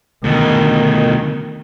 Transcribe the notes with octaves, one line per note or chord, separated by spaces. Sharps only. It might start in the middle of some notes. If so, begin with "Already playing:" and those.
D2 B2 D#3